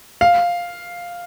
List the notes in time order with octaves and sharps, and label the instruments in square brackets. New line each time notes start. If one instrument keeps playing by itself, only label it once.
[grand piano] F5